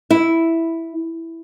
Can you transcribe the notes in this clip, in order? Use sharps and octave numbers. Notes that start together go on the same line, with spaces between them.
E4